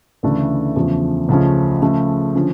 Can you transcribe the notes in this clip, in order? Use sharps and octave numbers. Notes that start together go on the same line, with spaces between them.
D2 C#3 E3 A3 D4
E2 C#3 F3 A3
C#2 C#3 F3 A3 C#4
C#3 F3 A3
D3 F3 C#4